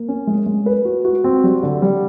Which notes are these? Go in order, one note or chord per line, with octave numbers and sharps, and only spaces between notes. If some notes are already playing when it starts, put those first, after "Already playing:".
Already playing: A#3
C#4
G#3
G#3
B4
F#4
F#4
C4
G3
D3
G3